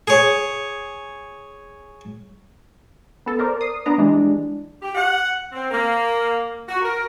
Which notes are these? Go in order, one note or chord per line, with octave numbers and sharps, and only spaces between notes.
G#4 C#5
B3 A4
A#4 C5 D5
D#6 C7
B3 D4 A#5
E3 G3 G#3 D4
G4
F#5
C4
A#3
F#4
A#4